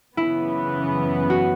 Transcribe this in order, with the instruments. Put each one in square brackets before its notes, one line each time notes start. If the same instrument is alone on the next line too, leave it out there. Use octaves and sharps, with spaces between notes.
[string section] F#2 C#3 E3 B3 [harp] E4
[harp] F#4